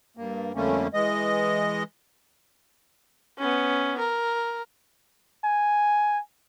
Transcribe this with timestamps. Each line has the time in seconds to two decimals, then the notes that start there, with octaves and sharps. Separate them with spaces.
0.17 G2 A#3
0.55 F2 D3 G3 A3 A#3 C#4
0.94 E3 G#3 D#5
3.38 B3 C#4
3.98 A#4
5.45 G#5